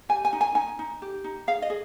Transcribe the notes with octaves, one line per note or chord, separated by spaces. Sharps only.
G4 G#5
G#5
D#4
G#5
D#4 G#5
D#4
G4
D#4
G#4 F5
D#5
G#4